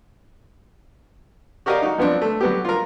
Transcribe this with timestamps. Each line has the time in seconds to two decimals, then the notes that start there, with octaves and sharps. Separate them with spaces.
1.66 F#4 G4 A#4 D5 D#5 F5
1.82 D#4 F#4
1.98 F3 B3 C4 D4
2.22 A3
2.40 F#3 B3 G4
2.65 F4 A#4